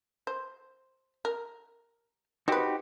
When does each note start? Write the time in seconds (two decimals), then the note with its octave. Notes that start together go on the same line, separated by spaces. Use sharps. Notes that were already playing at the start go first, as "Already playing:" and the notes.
0.27 C5
1.25 A#4
2.48 C4 D#4 F#4 G4 B4